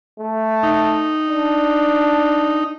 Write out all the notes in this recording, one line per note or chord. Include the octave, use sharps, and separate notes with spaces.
A3
D#4
D4